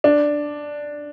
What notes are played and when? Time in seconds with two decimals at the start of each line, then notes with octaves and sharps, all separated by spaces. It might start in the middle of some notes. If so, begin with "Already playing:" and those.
0.04 D4